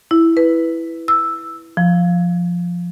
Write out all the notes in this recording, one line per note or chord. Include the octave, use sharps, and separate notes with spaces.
E4
B4
E6
F3